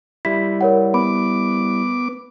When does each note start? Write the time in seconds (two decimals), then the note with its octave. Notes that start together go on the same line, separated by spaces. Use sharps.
0.25 G3 E4 B6
0.61 A#4 C#5 F#5
0.94 B3 B5 D6